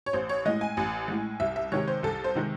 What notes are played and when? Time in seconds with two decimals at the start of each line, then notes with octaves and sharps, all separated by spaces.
0.06 C#5
0.13 A1 C5
0.29 C#5
0.46 A2 G#3 D#5
0.61 G#5
0.77 A1
1.08 A2 G#3
1.40 C2 E5
1.56 E5
1.72 C3 D#3 G#3 C#5
1.88 C5
2.03 C2 A4
2.24 C5
2.35 C3 D#3 G#3